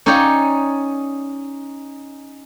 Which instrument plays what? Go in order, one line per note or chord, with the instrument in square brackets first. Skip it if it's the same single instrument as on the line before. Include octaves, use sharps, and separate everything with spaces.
[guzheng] C#4 D#4 C#5 D5 G5